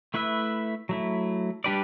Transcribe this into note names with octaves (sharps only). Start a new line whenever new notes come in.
A3 E4 B4 E5
F#3 A3 E4
G3 D4 G4 B4 D5